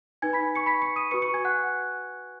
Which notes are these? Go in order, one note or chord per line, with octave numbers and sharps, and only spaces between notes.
D#4 B4 G#5 G#6
B5 B6
C#6 C#7
B5 B6
C#6 C#7
D#6 D#7
F#4 B4 C#6 C#7
C#6 C#7
G#5 G#6
F#5 F#6